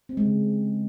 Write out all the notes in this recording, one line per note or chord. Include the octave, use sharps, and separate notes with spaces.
C4
G#3
C#3